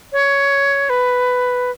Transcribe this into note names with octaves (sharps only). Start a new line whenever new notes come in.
C#5
B4